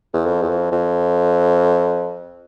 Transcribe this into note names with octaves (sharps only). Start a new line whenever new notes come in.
E2
F2
E2
F2
F2